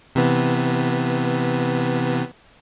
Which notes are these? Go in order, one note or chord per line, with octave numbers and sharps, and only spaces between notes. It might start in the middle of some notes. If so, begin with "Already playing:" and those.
C3 E3 B3